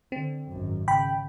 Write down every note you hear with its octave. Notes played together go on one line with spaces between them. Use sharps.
D3 C4
G#1 F#2
C#3 G5 B5